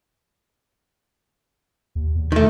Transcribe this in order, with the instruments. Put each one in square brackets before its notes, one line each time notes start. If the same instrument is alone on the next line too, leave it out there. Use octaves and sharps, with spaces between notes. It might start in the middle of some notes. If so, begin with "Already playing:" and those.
[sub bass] D#2
E2
[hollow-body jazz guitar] D#3 A3